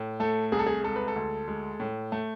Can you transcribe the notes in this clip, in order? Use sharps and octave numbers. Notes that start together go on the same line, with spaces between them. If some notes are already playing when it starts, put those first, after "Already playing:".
Already playing: A2
A3 A4
C2 G#4
A4
G#4
G#3 A4
B4
A4
D2
G#3
A2
A3